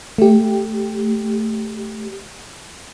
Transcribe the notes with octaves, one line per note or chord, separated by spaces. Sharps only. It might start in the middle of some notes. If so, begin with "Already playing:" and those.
A3 G4